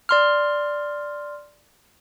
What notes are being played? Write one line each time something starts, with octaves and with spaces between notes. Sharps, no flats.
D5 C6 F6